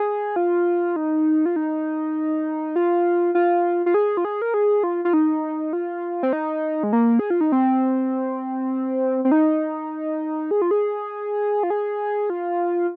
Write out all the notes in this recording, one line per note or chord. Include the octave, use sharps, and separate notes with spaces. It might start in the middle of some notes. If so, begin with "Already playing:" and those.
Already playing: G#4
F4
D#4
F4
D#4
F4
F4
F4
G#4
F4
G#4
A#4
G#4
F4
F4
D#4
F4
C4
D#4
G#3
A#3
G#4
F4
D#4
C4
C4
D#4
G#4
F4
G#4
F4
G#4
F4